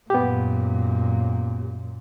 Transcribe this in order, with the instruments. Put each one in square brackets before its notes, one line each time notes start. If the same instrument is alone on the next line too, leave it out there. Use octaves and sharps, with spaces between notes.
[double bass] F#2 A#2 [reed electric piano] B3 G4